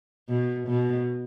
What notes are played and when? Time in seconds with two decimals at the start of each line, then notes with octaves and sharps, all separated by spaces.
0.29 B2
0.68 B2